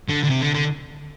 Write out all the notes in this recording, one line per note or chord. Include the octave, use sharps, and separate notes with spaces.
D3
D3
C3
D3
D3